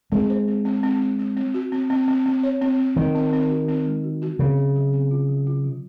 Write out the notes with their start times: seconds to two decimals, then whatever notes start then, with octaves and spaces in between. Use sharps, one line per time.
0.12 G#3 C4
0.30 C5
0.48 C4
0.65 C4
0.83 C4
1.01 C4
1.19 C4
1.37 C4
1.54 F#4
1.72 C4
1.90 C4
2.08 C4
2.26 C4
2.43 C#5
2.62 C4
2.79 C4
2.96 D#3 C4
3.15 C4
3.33 C4
3.50 F#4
3.68 C4
3.86 G#3
4.04 F#4
4.22 F#4
4.39 C#3 C4
4.57 F#3
4.76 F#3
4.93 C4
5.11 F4
5.29 F#3
5.47 F4
5.64 F#3